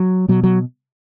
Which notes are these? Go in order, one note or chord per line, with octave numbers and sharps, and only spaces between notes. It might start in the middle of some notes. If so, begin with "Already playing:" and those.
Already playing: F#3
B2 F#3
F#3